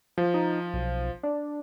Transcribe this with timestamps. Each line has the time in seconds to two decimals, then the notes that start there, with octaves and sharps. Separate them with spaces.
0.18 F3
0.34 D#4
0.74 B1
1.23 D4